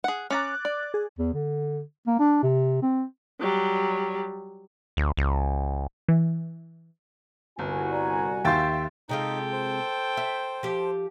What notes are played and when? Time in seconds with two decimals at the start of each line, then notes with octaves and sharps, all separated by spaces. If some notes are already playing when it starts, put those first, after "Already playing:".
0.04 G#4 F#5
0.30 C#4 F5 A#5 D6 F#6 A6
0.65 D5
0.94 G#4
1.19 E2
1.34 D3
2.07 A#3
2.20 D4
2.43 C3
2.82 C4
3.41 F#3 G3
4.97 D2
5.17 C#2
6.08 E3
7.59 G1 C2 F#4 G#5
7.91 D5 A#5
8.44 D#2 E5 F5 G5 C6 A6
9.09 C3 G#3 D#4 F4 A4 G5
9.53 C5
10.17 E5
10.63 F3 G4